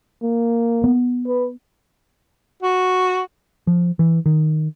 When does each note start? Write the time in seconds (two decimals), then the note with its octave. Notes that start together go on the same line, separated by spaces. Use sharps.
0.23 A#3
0.84 B3
1.27 B4
2.63 F#4
3.67 F3
3.99 E3
4.26 D#3